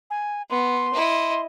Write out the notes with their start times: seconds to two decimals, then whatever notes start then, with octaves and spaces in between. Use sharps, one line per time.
0.10 G#5
0.50 B3 C6
0.94 E4 D#5